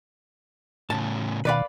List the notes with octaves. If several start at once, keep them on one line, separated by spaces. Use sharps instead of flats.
A2 C#3 A5
B2 D#3 B4 D5 F5 B5 F#6